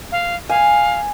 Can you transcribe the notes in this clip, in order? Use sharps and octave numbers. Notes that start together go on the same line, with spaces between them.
F5
F5 G#5